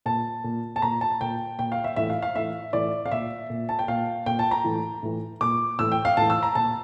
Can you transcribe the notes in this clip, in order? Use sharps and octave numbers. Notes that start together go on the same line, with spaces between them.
A#2 A5
A#2
A5
A#2 A#5
A5
A#2 G5
A#2 G5
F5
E5
A2 E3 E5
F5
F5
A2 E3 E5
A2 E3 D5
F5
A#2 E5
A#2
A5
G5
A#2 F5
A#2 G5
A5
A#5
A2 E3
A2 E3
A#2 D6
A2 E3 E6
G5
F5
A2 E3 A5
E6
A#5
A#2 A5